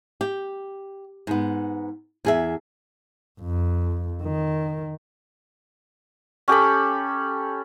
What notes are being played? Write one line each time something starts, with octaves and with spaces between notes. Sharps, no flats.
G4
G#2 B3
E2 G#4 E5
F2
D#3
C#4 G4 A4 B5